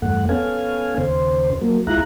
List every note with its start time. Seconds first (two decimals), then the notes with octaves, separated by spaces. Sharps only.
0.02 E2 G2 A3 F#5
0.29 B3 C#4 A4 F5 G#5
0.98 D#2 C#3 C5
1.61 F#3 A#3
1.87 D2 G#3 E4 F4 A#5 F#6